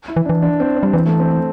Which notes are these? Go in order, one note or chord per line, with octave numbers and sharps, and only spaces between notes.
E4
E3
D4
E3
D4
C4
C4
G3
E3 C4
A3
C4
A3